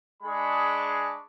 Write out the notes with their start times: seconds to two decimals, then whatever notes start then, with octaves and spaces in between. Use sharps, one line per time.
0.23 G#3 D4 G#4 B5 C#6